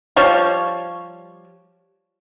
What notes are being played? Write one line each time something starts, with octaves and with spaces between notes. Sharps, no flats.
F3 G3 F4 C#5